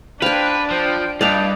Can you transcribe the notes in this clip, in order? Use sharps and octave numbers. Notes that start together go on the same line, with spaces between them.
D4 B4 C5 F5 G5 G#5
F3 C5 G5
G2 D5 D#5 F5 G5 A5 A#5